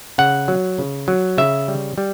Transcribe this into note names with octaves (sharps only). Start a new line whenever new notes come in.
C#3 F#5
F#3
C#3
F#3
C#3 E5
G3
G3